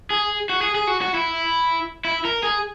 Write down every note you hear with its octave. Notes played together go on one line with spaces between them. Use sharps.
G#4
F#4
G#4
G#4
F#4
F#4
E4
E4
A#4
G#4